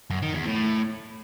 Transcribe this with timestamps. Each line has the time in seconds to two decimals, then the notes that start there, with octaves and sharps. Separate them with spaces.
0.11 F#2
0.22 D#3
0.34 E2
0.46 A2